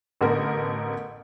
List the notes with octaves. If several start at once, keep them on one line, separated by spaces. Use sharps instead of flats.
A1 D3 B3 A#4